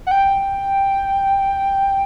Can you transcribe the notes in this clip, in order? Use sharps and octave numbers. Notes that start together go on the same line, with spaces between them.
F#5
G5